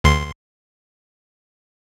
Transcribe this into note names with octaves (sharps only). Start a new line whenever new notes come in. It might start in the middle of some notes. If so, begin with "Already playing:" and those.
D2 C6